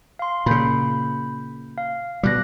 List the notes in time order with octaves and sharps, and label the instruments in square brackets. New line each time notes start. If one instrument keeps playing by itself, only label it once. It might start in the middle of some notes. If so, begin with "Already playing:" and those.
[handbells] F5 C6
[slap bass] A#2 C#3 [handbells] B5 G6
[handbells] F5
[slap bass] B2 G3 [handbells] D6 F#6 A#6